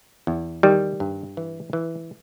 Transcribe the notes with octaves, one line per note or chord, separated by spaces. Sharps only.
E2
D#3 G3
G2
E3
E3